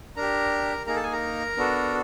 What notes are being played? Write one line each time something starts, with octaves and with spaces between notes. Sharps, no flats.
D4 G4 A#4 A#5
A#3 D#4 G#4 A#4 A#5
A4 A5
G#4 G#5
A#4 A#5
B3 D4 F#4 A4